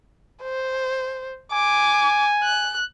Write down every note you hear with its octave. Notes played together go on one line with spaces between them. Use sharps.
C5
G#5 D6
F#6